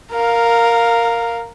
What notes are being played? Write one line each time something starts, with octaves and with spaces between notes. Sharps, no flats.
A#4 F5